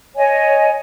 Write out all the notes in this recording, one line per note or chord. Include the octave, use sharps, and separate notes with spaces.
C#5 D#5 G#5